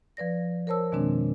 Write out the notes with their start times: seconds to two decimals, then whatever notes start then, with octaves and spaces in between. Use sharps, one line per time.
0.17 F3 B4 D5 A#6
0.67 A#4 C5 C#5 A5 E6
0.92 F2 B2 D#3 G#3 C4 D4